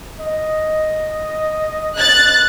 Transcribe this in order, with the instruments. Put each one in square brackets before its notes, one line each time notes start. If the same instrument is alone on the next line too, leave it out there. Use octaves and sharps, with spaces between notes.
[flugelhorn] D#5
[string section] F#6 [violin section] A6